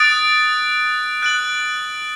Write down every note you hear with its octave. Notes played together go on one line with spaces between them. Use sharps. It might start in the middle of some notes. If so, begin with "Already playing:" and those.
Already playing: D#6 F#6 A6 D7
F#6 A6 D7 F#7